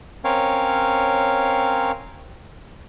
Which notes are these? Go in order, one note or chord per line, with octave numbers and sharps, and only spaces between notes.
C4 C#4 A#4 C#5 F5